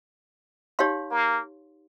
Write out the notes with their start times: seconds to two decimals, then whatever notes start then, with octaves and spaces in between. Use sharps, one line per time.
0.79 D#4 G4 C#5 F5 C6
1.11 A#3